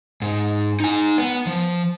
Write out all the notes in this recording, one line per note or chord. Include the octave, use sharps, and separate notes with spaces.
G#2
D#4 G#5
B3
F3